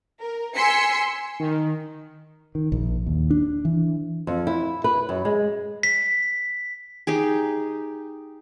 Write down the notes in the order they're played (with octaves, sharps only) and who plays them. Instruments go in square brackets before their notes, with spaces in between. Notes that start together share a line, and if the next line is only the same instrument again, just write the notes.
[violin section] A#4
G#5 C6 E6 B6 C#7
[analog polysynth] D#3
[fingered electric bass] D#3
A#1
D#2
D4
E3
[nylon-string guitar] F2
E4
B4
F#2
G#3
[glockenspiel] B6
[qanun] D#4 G4 G#4